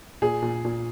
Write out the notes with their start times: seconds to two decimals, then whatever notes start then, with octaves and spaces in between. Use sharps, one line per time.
0.22 A#2 G#4
0.42 A#2
0.65 A#2